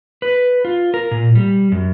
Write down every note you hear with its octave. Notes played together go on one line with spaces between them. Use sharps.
B4
F4
A#4
A#2
G3
F#2